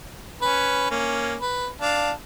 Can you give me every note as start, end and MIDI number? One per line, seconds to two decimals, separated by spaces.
0.42 0.89 61
0.42 0.89 71
0.91 1.35 58
0.91 1.35 61
1.40 1.68 71
1.81 2.11 62
1.81 2.11 77